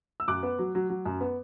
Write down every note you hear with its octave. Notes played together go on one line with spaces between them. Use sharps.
E6
F#2 D6 F#6
B3
F#3
F#3
F#3
F#2
B3